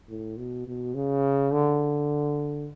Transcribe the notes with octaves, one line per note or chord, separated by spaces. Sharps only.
A2
B2
B2
C#3
D3